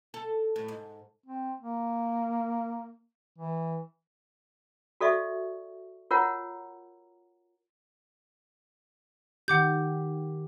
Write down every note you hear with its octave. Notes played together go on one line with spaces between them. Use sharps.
A4
A2
G#2
C4
A#3
E3
F#4 A4 D5 E5 C#6
F4 A#4 C#5 F#5 A#5
D#3 G4 F#5 D6 G6